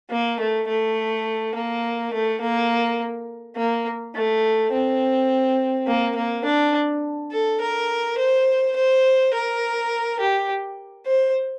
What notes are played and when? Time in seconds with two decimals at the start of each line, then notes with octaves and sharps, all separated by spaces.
0.10 A#3
0.40 A3
0.68 A3
1.55 A#3
2.13 A3
2.41 A#3
3.56 A#3
4.15 A3
4.72 C4
5.87 A#3
6.16 A#3
6.45 D4
7.31 A4
7.61 A#4
8.18 C5
8.76 C5
9.34 A#4
10.20 G4
11.06 C5